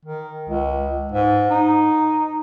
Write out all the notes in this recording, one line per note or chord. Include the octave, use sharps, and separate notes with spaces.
D#3
C#2
G#2
D#4